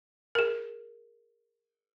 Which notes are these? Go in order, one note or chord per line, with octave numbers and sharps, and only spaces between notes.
G#4 A#4